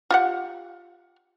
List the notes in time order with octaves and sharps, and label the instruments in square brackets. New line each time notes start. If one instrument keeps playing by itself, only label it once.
[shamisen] F4 G4 F#5